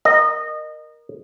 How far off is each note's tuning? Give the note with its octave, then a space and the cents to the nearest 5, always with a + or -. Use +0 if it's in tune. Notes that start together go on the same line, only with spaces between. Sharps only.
A#4 +10 D#5 -20